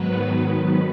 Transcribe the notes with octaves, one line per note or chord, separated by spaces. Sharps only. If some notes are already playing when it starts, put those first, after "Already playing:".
Already playing: G#2 D#3 F#3 B3 B4